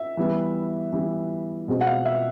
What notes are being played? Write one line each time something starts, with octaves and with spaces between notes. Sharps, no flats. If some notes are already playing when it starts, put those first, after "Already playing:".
Already playing: E5
E3 G3 B3
E3 G3 B3
B2 G#3 C4
F#5
F5
E5